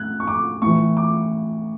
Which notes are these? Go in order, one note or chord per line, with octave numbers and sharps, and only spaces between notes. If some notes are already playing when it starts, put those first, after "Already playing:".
Already playing: A2 E6 F#6 G#6
C#6
D6
A2 E3 C#6
D6